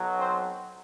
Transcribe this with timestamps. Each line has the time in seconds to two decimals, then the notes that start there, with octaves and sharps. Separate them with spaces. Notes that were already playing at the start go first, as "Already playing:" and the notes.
Already playing: B1 B2 F#3
0.19 C4 C5